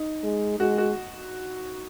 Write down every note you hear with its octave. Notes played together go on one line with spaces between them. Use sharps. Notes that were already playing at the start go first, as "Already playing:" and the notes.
Already playing: D#4
G#3
G#3 F#4
F#4